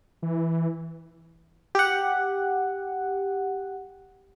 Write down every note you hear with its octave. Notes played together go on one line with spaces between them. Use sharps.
E3
G4 F#5